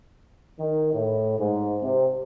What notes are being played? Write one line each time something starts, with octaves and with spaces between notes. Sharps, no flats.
D#3
A2
G#2
C3